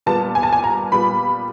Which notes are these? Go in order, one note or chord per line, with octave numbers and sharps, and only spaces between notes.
A#2 G3 B3 A5
G#5
A5
G#5
A#5
A#2 G3 B3 B5